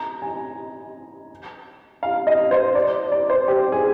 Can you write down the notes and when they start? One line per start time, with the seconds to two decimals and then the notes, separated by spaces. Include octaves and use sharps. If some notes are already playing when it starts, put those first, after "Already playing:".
Already playing: A#5
0.22 G#5
2.03 F5
2.27 D#5
2.51 C5
2.75 D5
3.12 D5
3.30 C5
3.48 G4
3.72 G#4